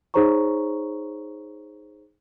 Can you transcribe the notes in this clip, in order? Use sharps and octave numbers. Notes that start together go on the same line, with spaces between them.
D#4 G#4 C5 C#5 A#5 C#6